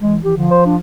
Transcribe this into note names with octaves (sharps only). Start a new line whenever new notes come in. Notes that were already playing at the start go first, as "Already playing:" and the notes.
E3 G#3
E3 G4
D3 F3
C5
D4